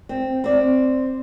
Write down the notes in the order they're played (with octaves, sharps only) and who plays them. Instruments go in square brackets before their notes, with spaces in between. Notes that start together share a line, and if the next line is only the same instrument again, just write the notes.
[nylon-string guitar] C4
C4 D5